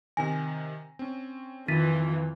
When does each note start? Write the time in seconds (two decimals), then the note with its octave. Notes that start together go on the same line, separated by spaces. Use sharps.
0.17 C3 D#3 G#5 A#6
0.99 C4 C#4
1.68 F2 D#3 E3 F4 A6 B6 D#7